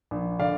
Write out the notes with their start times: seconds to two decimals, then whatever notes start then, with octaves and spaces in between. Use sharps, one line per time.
0.11 A#1
0.39 D3 D5 F5